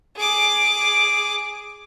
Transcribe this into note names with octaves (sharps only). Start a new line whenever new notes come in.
G#4 D6